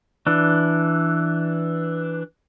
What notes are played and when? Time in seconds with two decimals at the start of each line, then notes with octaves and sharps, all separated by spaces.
0.27 E3 D4